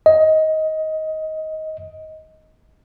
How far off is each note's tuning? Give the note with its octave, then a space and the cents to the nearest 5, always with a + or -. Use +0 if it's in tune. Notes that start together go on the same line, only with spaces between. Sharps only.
D#5 +15